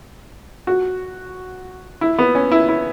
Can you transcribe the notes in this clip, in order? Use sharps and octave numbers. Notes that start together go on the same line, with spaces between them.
F#4
E4
B3
C#4
E4
E4